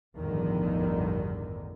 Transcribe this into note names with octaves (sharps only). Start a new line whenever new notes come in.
A1 E2 G2 D3 D#3 F3